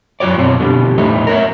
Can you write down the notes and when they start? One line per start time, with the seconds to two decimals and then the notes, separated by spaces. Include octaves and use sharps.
0.20 F#2 F#3 F#4 C#5 D5
0.37 F#2 B2 C4 C#5
0.59 B2 D3 G3
0.98 E2 A2 A3 D#4
1.27 A#4 C#5 E5